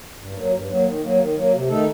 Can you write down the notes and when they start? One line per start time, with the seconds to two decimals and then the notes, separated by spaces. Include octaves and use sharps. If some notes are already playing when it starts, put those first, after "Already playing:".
0.18 G2
0.34 F#3 A#3
0.51 G2
0.67 F#3 A#3
0.84 D#3
1.02 F#3 A#3
1.18 D#3
1.35 F#3 A#3
1.52 C3
1.68 D#3 A3 D#4 A4